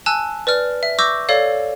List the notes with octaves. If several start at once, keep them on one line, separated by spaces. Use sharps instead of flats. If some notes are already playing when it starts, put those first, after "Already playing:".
G#5 A5 E6 F#6
B4 D5 F6
E5
C#6 D6 E6 G6 A#6
A4 C#5 D5 F5